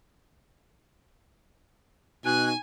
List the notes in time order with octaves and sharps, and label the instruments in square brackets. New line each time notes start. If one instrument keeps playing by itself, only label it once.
[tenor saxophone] B2 [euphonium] D#4 [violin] G#5 [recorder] F#6